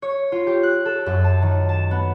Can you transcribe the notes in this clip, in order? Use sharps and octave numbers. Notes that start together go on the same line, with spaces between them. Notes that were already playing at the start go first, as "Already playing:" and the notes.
C#5
F4
G4
F#6
A4
F#2
A5
D#3
A5
B3